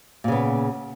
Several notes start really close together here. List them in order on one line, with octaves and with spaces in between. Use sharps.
A#2 C#3 B3